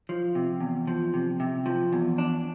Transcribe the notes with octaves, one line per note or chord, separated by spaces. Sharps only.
F3
C3
E2
F3
C3
C3
F3
E2
D4